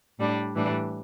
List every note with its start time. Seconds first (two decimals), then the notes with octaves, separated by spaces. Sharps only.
0.18 A2 G3 D4
0.55 A2 E3 G3 D4